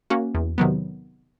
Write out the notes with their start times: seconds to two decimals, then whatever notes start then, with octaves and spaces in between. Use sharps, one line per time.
0.10 A#3 C#4 F#4
0.35 E2
0.58 C3 D#3 F#3 B3